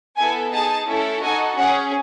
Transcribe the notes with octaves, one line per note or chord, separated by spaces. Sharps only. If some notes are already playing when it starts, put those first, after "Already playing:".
B3 E4 A4 G#5
D#4 G#4 A5
A3 C#4 E4 A4
D#4 F#4 A4 G#5
C#4 G#4 F#5